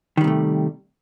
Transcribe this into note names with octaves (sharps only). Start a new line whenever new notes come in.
C3 D#3 G3 A3